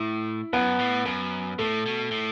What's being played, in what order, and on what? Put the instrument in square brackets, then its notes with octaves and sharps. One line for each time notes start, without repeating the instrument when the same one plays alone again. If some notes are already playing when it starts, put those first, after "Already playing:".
Already playing: [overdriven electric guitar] A2 [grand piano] E4
[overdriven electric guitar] F#2 [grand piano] B3
[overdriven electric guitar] A2
[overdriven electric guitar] F#2 [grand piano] B3
[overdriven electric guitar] A2 [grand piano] A3
[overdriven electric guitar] B2
A2